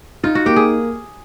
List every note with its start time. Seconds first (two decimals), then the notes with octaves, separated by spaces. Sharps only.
0.23 D#4 F4
0.35 F#4
0.46 A#3 G4
0.56 G#4